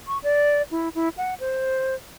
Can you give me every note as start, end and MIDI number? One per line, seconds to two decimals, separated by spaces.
0.07 0.18 85
0.23 0.62 74
0.71 0.89 64
0.95 1.09 64
1.17 1.34 78
1.40 1.95 72